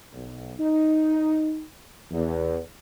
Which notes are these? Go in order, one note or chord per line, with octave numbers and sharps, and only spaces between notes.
B1
D#4
E2